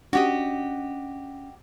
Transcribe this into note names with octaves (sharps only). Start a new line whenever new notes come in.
C#4 D4 F#4 G4 D#5